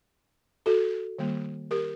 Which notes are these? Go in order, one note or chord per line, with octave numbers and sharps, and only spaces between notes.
F#4 A4
D#3 G3 A#3
G4 A#4